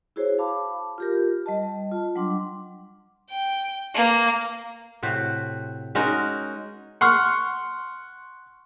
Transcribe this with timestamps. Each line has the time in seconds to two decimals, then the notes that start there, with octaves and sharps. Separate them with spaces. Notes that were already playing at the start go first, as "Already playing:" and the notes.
0.16 E4 F#4 G#4 C5 C#5
0.39 F5 A5 B5 D6
0.98 F4 G4 A#4
1.46 G3 D#5 A5
1.91 F4
2.15 F#3 G3 D4 C6 D6
3.30 G5
3.94 A#3
5.03 A2 C3 F#4
5.95 G#3 C#4 D#4 F#4 A#4
7.01 F#5 C6 C#6 F6